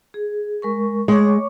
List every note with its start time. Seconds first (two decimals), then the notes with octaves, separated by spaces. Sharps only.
0.14 G#4
0.62 G#3 A#4 C#6
1.08 G#3 C#5 C#6 D6